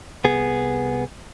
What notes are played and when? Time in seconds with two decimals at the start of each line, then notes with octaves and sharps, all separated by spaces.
0.24 C2 B3 G#4